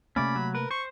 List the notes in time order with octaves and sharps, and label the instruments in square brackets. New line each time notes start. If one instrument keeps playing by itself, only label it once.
[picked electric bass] C3 A3 A#3 [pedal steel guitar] C#4 D5 [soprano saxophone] B5
[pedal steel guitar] F#3
[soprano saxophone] A#4 [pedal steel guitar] B4
[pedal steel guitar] C5 [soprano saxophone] C#6